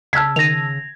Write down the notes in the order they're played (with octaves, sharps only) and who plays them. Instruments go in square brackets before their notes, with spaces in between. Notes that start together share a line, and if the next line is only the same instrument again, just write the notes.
[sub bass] C#3 [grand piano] A5 E6 G#6 [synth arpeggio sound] F6 B6
[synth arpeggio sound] D#3 D#7 [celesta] A#6 F7